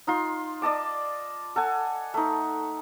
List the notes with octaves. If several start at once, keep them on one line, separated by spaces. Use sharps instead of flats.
D#4 F4 C6
D5 D#5 A5 D6
A4 F#5 G#5
A3 D#4